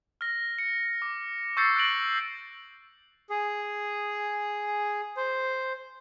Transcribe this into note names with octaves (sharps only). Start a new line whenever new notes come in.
F6 A#6
C#7
D6
C#6 E6 G6 A6 C7 C#7
F#6 A#6 D7 F#7
G#4
C5